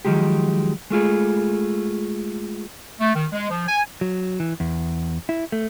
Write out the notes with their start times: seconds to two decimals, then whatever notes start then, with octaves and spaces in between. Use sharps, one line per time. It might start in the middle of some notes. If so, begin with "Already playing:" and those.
0.05 D#3 F3 F#3 G#3 G4
0.90 G#3 A3 F4 G#4
3.00 A3
3.15 D#3
3.33 G#3
3.50 F3
3.68 G#5
4.01 F#3
4.40 E3
4.60 E2
5.29 E4
5.52 A3